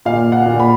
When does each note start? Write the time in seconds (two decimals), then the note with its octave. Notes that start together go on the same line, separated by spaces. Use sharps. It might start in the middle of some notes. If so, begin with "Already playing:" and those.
0.05 A#2 F5
0.32 F#5
0.46 A#2
0.60 B5